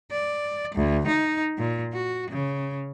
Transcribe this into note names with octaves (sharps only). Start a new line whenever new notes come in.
D5
D2
D#4
A#2
F#4
C#3